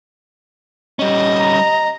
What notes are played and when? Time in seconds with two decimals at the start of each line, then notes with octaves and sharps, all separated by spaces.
0.99 G3 C#4 D#5
1.41 A#5